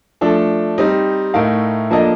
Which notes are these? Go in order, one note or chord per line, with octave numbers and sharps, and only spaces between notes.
F3 A3 D4 A4
G3 C4 D#4
A2 A3 D#4 A#4 F5
F3 A#3 D4 A4 D#5